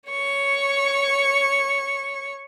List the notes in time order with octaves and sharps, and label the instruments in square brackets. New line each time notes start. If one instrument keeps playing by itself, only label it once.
[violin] C#5 C#6